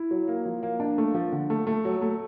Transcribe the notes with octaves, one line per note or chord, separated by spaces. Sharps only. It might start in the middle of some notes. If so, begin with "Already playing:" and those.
Already playing: E4
F#3
A#3
F3
A#3
D4
A3
F3
D3
A3
A3
F#3
A3